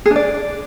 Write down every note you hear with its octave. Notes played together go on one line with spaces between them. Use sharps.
G#4
D4
D5